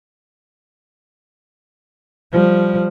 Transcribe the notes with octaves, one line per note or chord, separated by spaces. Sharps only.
F3 G3